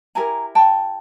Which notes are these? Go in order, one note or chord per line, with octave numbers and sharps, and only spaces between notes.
E4 G4 A#4 G#5 A#5
G5 A5